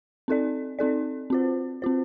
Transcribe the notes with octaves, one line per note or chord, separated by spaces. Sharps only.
C4 D#4 A4 D5
C4 D#4 A4 D5
C4 F4 C5
C4 F4 C5